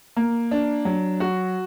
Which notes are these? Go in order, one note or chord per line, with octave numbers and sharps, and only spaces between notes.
A#3
D4
F#3
F#4